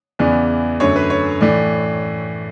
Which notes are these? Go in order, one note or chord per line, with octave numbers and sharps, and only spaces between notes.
E2 C#3 E3 B3 D5
F#2 D3 A3 C#5
B4
C#5
A2 E3 A3 D5